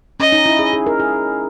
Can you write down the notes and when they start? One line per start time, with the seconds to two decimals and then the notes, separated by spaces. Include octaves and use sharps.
0.20 C#4 D#5
0.32 D#4
0.46 E4
0.59 G#4
0.73 G#4
0.87 A#4
1.00 G#4